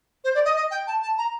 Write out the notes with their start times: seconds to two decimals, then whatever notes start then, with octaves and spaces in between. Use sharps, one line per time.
0.24 C5
0.35 D5
0.45 D#5
0.56 D#5
0.71 G5
0.87 A5
1.02 A5
1.18 A#5